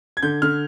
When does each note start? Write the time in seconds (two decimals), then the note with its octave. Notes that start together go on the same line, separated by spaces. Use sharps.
0.17 G#6
0.23 D3 G6
0.42 D3 F6